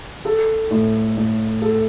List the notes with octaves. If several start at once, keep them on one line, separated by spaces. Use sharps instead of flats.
A4
A2
A2
A4